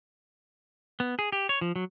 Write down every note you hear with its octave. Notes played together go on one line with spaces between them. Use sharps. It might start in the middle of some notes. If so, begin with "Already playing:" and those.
B3
G#4
G4
C#5
F3
F#3